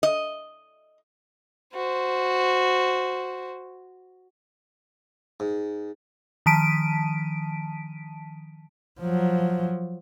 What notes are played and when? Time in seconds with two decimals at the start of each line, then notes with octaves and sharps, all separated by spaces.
0.03 D#5
1.75 F#4 C5
5.40 G#2
6.46 D#3 F3 A5 B6 D7 D#7
9.00 F3 F#3